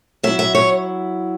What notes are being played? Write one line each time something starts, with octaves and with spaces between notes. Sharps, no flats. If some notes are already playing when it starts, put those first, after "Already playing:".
F#3 E4 E5
E5
C#5